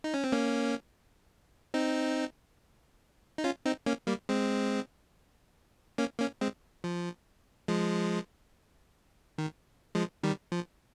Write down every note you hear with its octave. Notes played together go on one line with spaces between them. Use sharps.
D#4
C#4
C4
A#3 C#4
C4 D#4
D#4
C#4 F4
C4 D#4
A#3 C#4
G3 A#3
G#3 C4
A#3 C#4
A#3 C#4
G#3 C4
F3
F3 G#3
D#3
F3 G#3
D#3 G3
F3